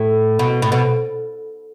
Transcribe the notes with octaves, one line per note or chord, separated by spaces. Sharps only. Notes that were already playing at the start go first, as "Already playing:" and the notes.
Already playing: A2
B2
A2
B2